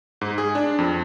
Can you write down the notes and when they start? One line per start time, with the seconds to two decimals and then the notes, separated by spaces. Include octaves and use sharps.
0.21 G#2
0.38 G#4
0.55 D4
0.79 F2